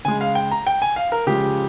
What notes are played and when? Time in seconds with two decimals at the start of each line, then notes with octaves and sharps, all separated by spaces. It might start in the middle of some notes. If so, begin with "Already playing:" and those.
0.05 C#3 G#3 G#5
0.21 F5
0.35 G5
0.51 A#5
0.67 G5
0.82 G#5
0.96 F5
1.12 A#4
1.27 C#3 F3 G#3 G4